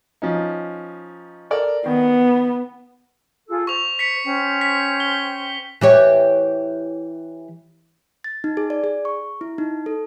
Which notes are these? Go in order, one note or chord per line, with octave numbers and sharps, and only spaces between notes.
F3 C#4 D#4
A4 A#4 D5
D#3 B3
F4 G#4 A4
C5 C#6 F7
B6 C#7
C#4 C5 G5
B6
G7
E3 G4 C#5
A6
D#4
G#4
D5
G#4
C#6
E4
D#4
A4